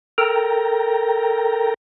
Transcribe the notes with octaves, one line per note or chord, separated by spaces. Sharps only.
A4 A#4 G5 A#5